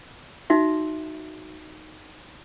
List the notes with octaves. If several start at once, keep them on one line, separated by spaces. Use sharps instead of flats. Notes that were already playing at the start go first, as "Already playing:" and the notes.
D#4 F#4 E5